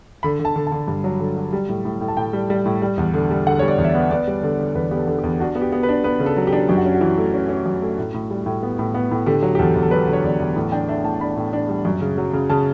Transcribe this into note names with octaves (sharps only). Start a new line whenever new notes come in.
D3 B5
D3
A5
D3
A5
D3
G2
F#3
D3
F#3
G3
A2
A2
A2
A5
A2 G5
G3
G3
A2
G3
E2
D3
G3
D3 F#5
G3 C#5
D5
E2
E5
D5
B3
B3 D5
G3
D3
D3
E2 B4
B3 G4
A4
D3
G4
E2
D4 F#4
B3
G4
B3
B4
D4
B3 B4
C#3
A4
F#3
G4
D4
F#2 G4
F#4
C#4
F#4
E3
A3
C#4
C#4
F#2
A3
A2
A2
G3
A2
B3
A2
B3
A2
D3 G4
F#3
G4
E2 A4
E2
A4
F#3 B4
D3
C#5
E2 D5
E2
A2
D4 G5
D4 E5
A2 A5
D4 B5
A2
D4
G3
F#2
C#3
F#3
C#3
C#3 A5